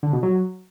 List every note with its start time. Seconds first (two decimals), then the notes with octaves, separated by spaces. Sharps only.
0.03 D3
0.13 B2
0.23 F#3